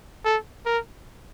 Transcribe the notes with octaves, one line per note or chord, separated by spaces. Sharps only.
A4
A#4